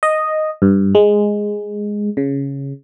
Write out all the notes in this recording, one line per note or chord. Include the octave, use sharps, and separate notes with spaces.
D#5
G2
G#3
C#3